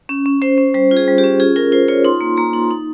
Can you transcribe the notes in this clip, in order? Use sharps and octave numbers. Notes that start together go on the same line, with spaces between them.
C#4
C#4
C#4 C5
C#4
G3 C5
F4
G#4
G3
G4
C#4
F4 G#4
F4 A#4
F4 C5
F4 C#5
D#4 C6
A#3
A#3 A#5
D#4
D#4